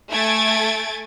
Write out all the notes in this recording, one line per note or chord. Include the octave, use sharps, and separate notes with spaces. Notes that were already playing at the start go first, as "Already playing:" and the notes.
A3 G#5 G#6 A6 D7